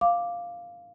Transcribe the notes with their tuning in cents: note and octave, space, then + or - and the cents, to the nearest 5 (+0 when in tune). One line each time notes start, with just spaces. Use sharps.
F5 +0 D6 +0